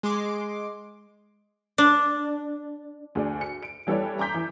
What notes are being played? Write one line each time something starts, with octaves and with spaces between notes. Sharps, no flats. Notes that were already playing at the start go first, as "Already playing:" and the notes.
G#3 C6 D6
D4
D2 G#4 D5
C#7
D7
E3 G3 A4 B4 C#5 D5
A#5 C6 D6 G6 B6
E3